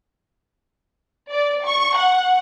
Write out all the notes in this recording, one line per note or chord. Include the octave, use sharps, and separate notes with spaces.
D5
C#6
F#5